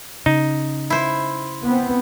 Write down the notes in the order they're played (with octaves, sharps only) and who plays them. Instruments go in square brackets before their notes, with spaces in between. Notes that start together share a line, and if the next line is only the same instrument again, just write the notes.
[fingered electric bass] C#3 [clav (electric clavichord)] D#4
[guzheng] E4 C5
[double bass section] B3 C4